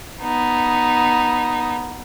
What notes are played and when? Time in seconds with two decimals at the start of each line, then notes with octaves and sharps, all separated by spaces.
0.22 B3 D#4